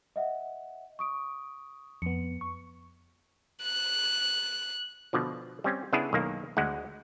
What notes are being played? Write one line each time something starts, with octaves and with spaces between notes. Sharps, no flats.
D#5 E5 F#5
C#6 D#6 D7
F2 B3 C#7
C#6
F#6
B2 D3 F3
G3 C4 C#4
C#3 B3 D4 E4 G#4
B1 D#3 A#3
D2 G#3 F#5